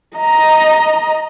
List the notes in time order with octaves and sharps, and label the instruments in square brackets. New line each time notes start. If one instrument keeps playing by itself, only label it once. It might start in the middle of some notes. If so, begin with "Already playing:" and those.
[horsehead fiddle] D#5 A#5